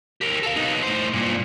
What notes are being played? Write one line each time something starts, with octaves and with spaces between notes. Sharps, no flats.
G4 A#4
A4 F5
B3 D#4
A2 C5
G2 A#2